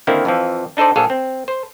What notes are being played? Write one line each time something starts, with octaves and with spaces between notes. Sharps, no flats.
D3 D#3 A#3 C4 E4
F2 E3 F3
D4 D#4 A4 C5 D5
A#1 F#3 G#4 A4 F5
C4
C5